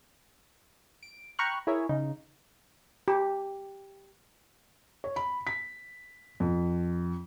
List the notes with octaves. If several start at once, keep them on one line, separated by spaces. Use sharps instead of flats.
D7
G5 A#5 B5 C#6 F6 F#6
E4 G#4 A#4 C#5 E5
C#3 D#4
G4
C#5
B5
B6
F2